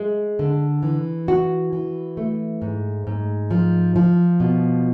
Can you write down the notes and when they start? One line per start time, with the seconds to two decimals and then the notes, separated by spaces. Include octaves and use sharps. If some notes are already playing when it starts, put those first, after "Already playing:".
Already playing: G#3
0.39 D3
0.83 E3
1.28 F#4
1.73 E3
2.17 A3
2.62 G#2
3.07 G#2
3.51 F3
3.96 F3
4.40 B2